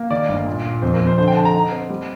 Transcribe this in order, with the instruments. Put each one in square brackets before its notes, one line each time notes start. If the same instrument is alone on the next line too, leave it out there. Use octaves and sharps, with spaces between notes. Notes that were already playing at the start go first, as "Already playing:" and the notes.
Already playing: [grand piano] A#3
[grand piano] D#3 [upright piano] D5
[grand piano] G1
A#2
A#2
[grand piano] F2 [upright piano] C5
[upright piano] A#4
[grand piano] F2
[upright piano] C5
[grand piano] D3 [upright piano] C5
[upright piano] G5
[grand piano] D3 [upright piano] A5
[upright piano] A#5
[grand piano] D#4
C4
G3